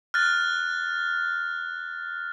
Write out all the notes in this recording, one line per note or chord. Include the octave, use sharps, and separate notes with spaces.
F6 F#6 A6